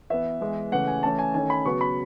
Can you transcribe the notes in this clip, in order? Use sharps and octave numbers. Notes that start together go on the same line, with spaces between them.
E3 B3 E5
E3 G#3 B3
C#3 E3 A3 F#5
G#5
E3 A3 C#4 A5
G#5
D#3 A3 C#4 G#5
B5
C#3 F#3 B3 C#6
B5